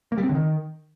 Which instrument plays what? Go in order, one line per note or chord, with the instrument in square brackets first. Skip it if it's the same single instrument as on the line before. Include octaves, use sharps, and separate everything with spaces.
[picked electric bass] A#3
G3
C4
D3
D#3